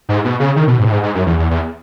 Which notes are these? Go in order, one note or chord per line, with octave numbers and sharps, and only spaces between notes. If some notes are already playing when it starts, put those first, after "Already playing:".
G#2
B2
C#3
D#3
B2
G#2
A2
G#2
G#2
F#2
E2
E2
E2